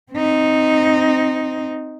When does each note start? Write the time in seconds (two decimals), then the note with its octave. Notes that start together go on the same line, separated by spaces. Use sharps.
0.12 C4 D#4